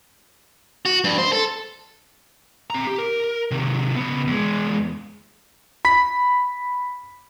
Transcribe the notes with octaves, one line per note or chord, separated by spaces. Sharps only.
F#4
G2
C5
A4
C4 A#5
G4
A#4
C3 D#3
C#3 B3
E2 G#3
B5 B6